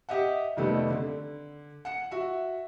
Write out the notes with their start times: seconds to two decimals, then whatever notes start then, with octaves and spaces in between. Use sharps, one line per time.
0.09 G4 D#5 E5 F#5
0.57 F2 C3 D#3 G3 A3 B3
0.90 D3
1.85 F#5 C#7
2.11 F#4 E5